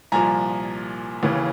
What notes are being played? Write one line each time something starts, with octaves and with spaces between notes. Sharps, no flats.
C2 A#2 F3 G#5 A#5
D#2 C#3 E3